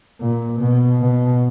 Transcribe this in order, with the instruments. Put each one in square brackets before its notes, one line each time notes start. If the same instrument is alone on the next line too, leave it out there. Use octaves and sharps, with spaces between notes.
[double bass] A#2
B2
B2